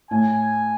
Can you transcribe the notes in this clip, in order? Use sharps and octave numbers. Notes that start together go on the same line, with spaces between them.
A2 G#5